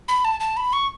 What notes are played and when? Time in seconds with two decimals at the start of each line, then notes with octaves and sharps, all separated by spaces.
0.08 B5
0.25 A5
0.40 A5
0.57 B5
0.73 C#6